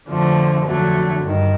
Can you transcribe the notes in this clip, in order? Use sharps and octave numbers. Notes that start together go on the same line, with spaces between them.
F2 D3 F3 A3
F2 D3 F#3 A3
G2 D#3